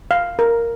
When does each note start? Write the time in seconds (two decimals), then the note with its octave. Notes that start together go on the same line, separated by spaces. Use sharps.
0.11 F5
0.39 A#4